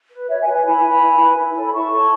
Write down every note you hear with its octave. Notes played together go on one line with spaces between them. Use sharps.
B4
F#4 C#5 E5
E5 G#5
B4
E5 G#5
E4 G#5 B5
B4
E4
B4
E4
A4 C#5
B5
E4 A5 C#6
A4 C#5